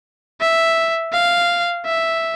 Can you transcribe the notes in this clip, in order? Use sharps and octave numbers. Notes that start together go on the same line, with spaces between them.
E5
F5
E5